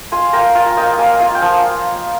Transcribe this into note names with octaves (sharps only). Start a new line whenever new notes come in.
F4 G#5 C6
A#3 G5 A#5
F4 F5 G#5
A#3 D#5 G5
A#3 F5 G#5
F4 F5 G#5
G5
F3 F5 G#5